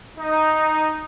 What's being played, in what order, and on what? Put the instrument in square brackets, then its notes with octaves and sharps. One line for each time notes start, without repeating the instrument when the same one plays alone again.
[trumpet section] D#4